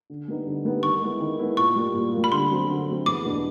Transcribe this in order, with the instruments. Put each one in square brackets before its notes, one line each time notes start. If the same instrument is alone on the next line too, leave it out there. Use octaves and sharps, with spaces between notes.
[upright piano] D3
G3 B3 D#4
D3
G3 B3 D#4
[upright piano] D#3 [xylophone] C#6
[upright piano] G#3 B3 E4
D#3
G#3 B3 E4
[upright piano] A#2 [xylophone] C#6
[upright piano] G3 A#3
A#2
G3 A#3
[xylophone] B5
[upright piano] D3 [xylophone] C6
[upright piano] F#3 A3 C4
D3
F#3 A3 C4
[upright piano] E2 [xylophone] D6
[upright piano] B2 G3 B3 D4